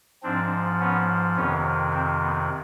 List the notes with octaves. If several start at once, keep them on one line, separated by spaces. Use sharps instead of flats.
G#2 F3 C4 D4
B3 C#4
F2 C3 D#3 B3 C#4
C4
B3